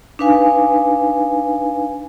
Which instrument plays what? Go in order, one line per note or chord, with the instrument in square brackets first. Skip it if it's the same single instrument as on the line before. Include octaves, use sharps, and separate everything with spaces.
[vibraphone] D4 D#4 B4 F5 G#5